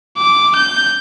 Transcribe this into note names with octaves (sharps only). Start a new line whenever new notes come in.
D6
G6